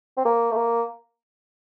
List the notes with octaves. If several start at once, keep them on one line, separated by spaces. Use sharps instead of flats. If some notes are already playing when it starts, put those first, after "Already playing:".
C4
A#3
A3
A#3